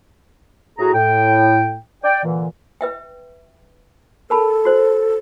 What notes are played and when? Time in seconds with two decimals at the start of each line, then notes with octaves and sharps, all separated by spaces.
0.78 A2 F#4 G#4 A#5
0.94 A2 G5
2.04 D5 G5
2.24 A#2 D3 E3
2.81 B4 E5 G5
4.30 A4 A#4 A5 B5
4.65 F#4 C5